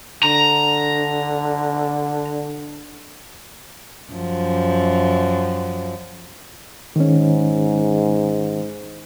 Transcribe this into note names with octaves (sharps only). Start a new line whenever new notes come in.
D3 A#5
F#2 F3
G#2 D#3 C#4